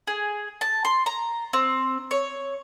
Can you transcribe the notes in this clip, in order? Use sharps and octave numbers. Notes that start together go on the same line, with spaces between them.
G#4
A5
C6
A#5
C4
C#5